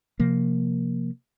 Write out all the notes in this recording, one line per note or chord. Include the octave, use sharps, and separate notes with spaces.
C3 F3 A#3